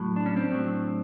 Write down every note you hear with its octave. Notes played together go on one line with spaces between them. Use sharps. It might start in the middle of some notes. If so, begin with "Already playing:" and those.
Already playing: A2 F#3
D4
C#4
C4 D4
A2 F#3